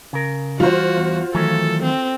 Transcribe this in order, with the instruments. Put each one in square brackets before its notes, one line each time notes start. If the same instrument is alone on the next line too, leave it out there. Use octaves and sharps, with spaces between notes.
[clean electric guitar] C#3 A#4
[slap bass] E3 G3 [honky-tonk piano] F4 C5 [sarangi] F#4
[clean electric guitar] E2
[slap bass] D#3 [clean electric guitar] E3 F#3 A3 [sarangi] A4
[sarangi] C4